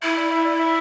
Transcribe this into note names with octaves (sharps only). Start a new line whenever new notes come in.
E4 E5
D5
E5
D5
E5